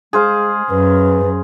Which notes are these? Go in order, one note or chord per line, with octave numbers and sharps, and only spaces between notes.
G#3 G#4 C5 F5
F#2 B4